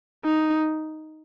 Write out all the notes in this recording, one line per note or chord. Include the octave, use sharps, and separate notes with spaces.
D#4